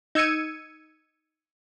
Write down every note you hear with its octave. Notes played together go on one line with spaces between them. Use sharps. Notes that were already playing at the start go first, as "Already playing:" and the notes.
D#4 E6 G#6 C#7 D#7